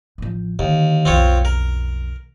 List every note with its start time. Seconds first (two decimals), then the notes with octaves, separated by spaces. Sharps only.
0.18 A1 F3
0.59 D#2 D3
1.05 B1 F2 C4 F4 C#5
1.45 A#4